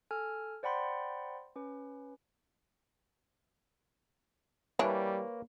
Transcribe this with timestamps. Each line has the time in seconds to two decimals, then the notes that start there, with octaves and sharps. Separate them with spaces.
0.11 A4 G#5 F6
0.63 C5 D5 F#5 G5 B5 C6
1.56 C#4 B4
4.79 E3 G3 A#3 D4 B4 C#5